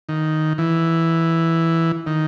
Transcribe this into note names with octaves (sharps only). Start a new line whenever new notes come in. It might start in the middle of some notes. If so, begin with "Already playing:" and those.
D#3
E3
D#3